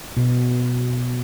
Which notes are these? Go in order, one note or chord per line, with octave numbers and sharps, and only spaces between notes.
B2